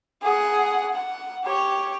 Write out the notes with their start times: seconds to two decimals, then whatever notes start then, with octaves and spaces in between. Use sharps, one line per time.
0.23 G#4 F#5
0.93 F#5
1.44 G4 C#5